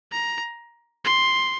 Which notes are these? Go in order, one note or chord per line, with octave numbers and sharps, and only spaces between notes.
A#5
C6